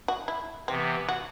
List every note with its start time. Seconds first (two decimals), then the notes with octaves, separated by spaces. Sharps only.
0.08 F#4
0.28 E4
0.68 C3 E3 B3 C4
1.09 F#4